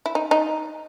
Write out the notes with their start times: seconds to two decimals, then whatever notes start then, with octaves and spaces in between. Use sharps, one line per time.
0.06 E4
0.15 D#4
0.31 D#4